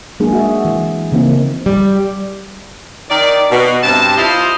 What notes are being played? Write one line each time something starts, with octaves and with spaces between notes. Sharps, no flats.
F#3 G#3 A#3 D4 D#4 G#4
F#4 E5
E3
C#3 E3 A#3 C4 D#4 F4
G3
D#3 D5
B2
G2 C3 A5
E4 F4 C5 D#5 F5